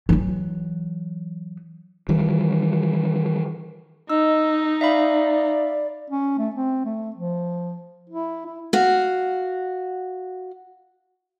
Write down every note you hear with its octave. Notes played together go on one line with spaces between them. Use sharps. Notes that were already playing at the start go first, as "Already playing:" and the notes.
E3 F#3
D#3 E3 G3
D#4 D#5 E6
D5 E5 F5 B5
C#4
A3
C4
A3
F3
E4
E4
F#4 F5